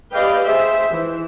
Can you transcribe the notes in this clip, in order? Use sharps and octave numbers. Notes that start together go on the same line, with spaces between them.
G4 B4 D5 D#5 F5 G5
G#4 C5 E5
E3